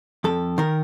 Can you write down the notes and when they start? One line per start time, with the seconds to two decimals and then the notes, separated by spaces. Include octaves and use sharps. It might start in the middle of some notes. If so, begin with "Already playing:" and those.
0.24 F2 A4
0.58 D#3 A#4